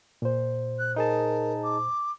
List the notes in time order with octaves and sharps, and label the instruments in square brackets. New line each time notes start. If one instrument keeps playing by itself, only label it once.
[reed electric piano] A#2 C5
[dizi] F#6
[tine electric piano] D#4 G#4 A5 [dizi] A#4
[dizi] D6